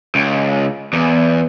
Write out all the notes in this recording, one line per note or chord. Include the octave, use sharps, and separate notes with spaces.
C#2
E2